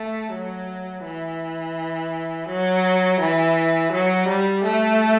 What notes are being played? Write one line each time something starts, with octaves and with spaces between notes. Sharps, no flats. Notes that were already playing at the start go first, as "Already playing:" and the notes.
Already playing: A3
F#3
E3
F#3
E3
F#3
G3
A3